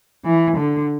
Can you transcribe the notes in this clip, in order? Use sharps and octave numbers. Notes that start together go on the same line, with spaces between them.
E3
D3